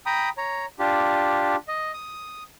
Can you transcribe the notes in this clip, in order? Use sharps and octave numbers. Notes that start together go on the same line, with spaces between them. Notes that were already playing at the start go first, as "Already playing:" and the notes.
G5 A#5 B5 D#6
C#5 A#5
D4 F4 G4
D#5
D#6